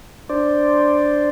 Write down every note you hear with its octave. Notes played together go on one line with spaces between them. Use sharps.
D4 C5 D5